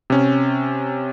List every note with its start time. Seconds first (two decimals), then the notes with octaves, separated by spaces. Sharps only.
0.10 C3 C#4